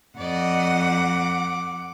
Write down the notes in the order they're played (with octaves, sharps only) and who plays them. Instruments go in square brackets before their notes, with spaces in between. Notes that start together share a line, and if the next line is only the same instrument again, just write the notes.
[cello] F2 F#5 [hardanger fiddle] D5 D#5
[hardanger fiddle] D6